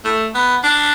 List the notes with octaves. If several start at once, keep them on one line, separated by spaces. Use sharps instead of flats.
A3
B3
D4